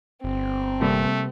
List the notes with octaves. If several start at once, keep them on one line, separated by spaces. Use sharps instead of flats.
G1 C4
C3 G3 A3 A#3